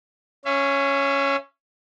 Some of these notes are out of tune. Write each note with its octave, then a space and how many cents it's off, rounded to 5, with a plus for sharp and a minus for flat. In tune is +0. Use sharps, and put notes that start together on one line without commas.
C#4 +0 E5 +40